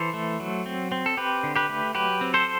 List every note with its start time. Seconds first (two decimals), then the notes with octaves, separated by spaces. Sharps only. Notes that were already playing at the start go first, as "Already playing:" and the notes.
Already playing: E3 A4 C5
0.14 A3
0.40 F#3
0.66 C4
0.92 C4
1.06 A4
1.17 C4 G4 B4
1.43 D3
1.56 G4 B4
1.69 A3
1.95 F#3 G4 B4
2.21 C4
2.34 A4 C5